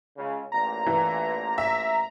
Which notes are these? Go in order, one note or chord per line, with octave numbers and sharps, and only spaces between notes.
C#2 C#3
A1 A#2 A#5
E3
E5